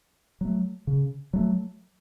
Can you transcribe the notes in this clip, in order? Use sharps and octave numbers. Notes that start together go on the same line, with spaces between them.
F#3 A3
C#3
F#3 A3